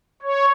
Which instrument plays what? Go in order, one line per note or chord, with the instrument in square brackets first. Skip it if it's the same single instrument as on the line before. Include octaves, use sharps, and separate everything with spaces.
[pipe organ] C#5